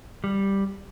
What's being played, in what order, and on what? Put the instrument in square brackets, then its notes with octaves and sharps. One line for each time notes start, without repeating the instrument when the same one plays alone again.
[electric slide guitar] G3